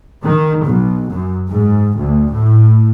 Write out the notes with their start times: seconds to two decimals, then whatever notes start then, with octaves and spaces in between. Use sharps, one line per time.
0.24 D#3
0.65 B1
1.12 F#2
1.50 G#2
1.98 D2
2.33 A2